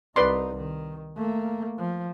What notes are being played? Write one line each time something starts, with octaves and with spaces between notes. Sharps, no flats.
C2 D#4 B4 D5 C6
D#3
A3 A#3
F3